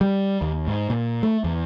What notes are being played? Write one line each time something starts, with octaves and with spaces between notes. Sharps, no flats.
G3
D#2
G#2
A#2
A3
E2